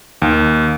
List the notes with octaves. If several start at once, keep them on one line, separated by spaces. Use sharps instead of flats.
D#2